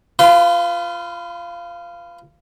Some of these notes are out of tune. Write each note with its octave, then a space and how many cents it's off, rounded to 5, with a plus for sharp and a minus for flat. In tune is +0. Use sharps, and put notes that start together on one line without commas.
F4 -15 B4 +20 C6 -40